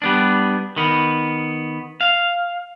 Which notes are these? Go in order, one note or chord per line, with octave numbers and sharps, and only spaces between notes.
G3 B3 D4
D#3 B3
F5